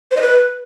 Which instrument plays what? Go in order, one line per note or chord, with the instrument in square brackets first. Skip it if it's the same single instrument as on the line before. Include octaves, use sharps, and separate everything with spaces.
[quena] C5
D#5
B4